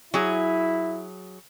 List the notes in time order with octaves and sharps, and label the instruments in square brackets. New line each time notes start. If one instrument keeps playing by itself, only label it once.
[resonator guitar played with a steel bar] F#3 G#4 [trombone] E4